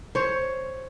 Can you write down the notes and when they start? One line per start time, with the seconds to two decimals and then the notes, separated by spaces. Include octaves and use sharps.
0.15 C5 C#5